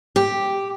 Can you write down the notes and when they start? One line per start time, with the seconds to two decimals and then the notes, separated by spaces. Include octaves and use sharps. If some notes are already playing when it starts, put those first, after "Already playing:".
0.16 G4